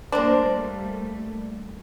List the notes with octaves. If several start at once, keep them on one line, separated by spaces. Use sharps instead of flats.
G3 A3 A#3 D4 C5